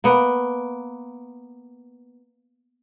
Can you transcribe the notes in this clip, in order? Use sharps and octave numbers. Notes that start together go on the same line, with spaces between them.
A#3 B3